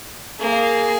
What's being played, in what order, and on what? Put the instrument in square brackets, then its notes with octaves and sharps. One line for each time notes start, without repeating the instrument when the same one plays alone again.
[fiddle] A#3 [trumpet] G#4